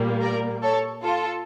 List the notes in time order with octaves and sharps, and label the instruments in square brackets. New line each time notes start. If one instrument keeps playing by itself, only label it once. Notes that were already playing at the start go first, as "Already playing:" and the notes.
Already playing: [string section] A#2 G3 A#3
A#4 D5
A4 C#5
F4 A4